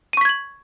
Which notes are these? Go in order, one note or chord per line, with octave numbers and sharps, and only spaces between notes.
C#6 G#6 B6 D#7 F#7